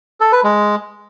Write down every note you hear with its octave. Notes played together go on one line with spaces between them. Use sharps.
A4
B4
G#3